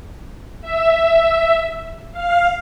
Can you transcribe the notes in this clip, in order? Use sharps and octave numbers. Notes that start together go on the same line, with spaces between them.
E5
F5